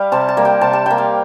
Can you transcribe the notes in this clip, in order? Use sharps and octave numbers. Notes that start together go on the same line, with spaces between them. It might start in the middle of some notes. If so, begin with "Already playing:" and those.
Already playing: G3 F5
C3 A5
A5
G3 A#3
G5
C3 A5
A5
G3 A#3 G5
F5